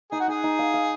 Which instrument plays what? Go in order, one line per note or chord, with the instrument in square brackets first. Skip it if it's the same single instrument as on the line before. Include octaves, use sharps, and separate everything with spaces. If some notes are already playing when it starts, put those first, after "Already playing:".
[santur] D#4 [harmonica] G#4
[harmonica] F#4
[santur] D#4 [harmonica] G#4
[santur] D#4
F5
F5